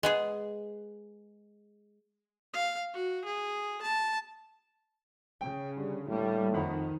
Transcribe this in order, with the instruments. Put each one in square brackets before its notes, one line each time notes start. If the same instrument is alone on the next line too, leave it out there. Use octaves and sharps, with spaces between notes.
[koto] G#3 B3 G#4
[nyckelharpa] F5
F#4
G#4
A5
[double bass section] C#3 [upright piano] G5
[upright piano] D3 [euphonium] G3
[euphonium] A2 [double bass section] G3 A#3
[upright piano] F2 F#5 B5 [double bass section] D#3